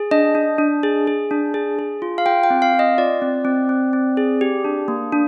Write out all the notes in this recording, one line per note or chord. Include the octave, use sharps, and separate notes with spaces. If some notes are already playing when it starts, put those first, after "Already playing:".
Already playing: G#4
D4 D#5
D4
D4
G#4
G#4
D4
G#4
G#4
F4
F5
F4 G5
G5
C4
F5
F4
D#5
F4 D5
C4
C4
C4
C4
G#4
G4
D4
A#3
D4